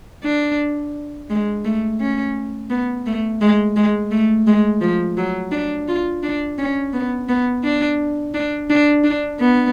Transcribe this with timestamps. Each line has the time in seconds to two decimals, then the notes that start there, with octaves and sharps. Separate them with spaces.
0.23 D4
1.30 G#3
1.65 A3
2.00 C#4
2.70 B3
3.06 A3
3.41 G#3
3.76 G#3
4.11 A3
4.47 G#3
4.81 F3
5.17 F#3
5.51 D4
5.88 F4
6.23 D4
6.58 C#4
6.93 B3
7.29 B3
7.64 D4
8.34 D4
8.70 D4
9.04 D4
9.40 B3